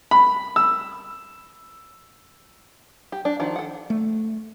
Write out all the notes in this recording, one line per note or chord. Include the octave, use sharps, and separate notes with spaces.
B5
E6
G4
D4
D#3 F3 D4 F#4
A4 F#5
A3